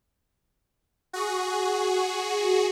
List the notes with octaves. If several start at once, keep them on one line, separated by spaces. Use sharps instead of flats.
F#4 G#4